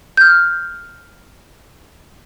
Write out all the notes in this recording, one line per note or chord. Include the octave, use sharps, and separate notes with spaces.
F6 G6